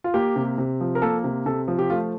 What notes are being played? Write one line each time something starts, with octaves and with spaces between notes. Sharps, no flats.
F4
A#3 G4
C3
C3
F3
A#4
A#3 A4
C3
C3 A4
F3
G4
A3 F4